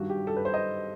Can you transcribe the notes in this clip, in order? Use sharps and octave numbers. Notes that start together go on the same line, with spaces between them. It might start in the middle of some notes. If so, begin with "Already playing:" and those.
Already playing: G2 D#3 G3 F#4
G4
A4
B4
C5
D#5